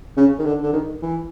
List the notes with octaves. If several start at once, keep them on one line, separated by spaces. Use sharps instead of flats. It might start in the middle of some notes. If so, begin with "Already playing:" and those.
C#3
D#3
D3
D3
D#3
E3